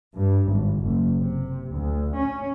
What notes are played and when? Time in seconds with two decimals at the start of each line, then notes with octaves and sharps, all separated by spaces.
0.17 G2
0.49 G#1
0.82 F#1
1.20 C3
1.74 D2
2.17 C#4